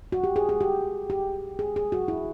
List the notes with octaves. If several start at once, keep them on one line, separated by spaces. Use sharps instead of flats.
F#4
G4
G#4
G#4
G4
G4
G#4
G#4
F#4
E4